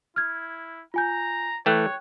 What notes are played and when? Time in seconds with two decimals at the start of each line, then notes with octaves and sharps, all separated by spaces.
0.16 E4 F6 G#6
0.94 F4 G#5 A#5 G6
1.66 E3 A3 C#5 G5 F#6